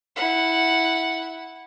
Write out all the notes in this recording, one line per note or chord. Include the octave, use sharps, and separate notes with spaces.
E4 F#5